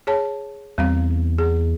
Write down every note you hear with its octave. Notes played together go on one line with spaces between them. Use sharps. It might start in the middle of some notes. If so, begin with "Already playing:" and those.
G#4 C#5 A5
E2 G3 C4 F5
G#4